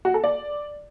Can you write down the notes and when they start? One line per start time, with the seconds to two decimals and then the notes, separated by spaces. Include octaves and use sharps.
0.05 F#4
0.14 A4
0.24 D5